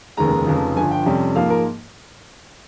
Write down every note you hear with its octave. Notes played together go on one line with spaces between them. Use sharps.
F1 D#2 C#3 G#3 A#5
F1 F2 C#3 F3
G1 G2 F3 G#5
G5
F2 C3 G3 C#4
G#2 F3 A#3 F5
A#4